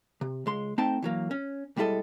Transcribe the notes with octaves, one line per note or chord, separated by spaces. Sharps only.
C3
C#2 G#3 C6
A3 C4 D#4 C5 G5 A5
E3 F#3 A#3
C#4
B1 G3 G#3 E4 A4 D#5